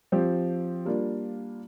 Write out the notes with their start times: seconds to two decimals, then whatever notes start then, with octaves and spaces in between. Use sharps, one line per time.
0.12 F3 C4 G4
0.85 G3 A#3 D4 F4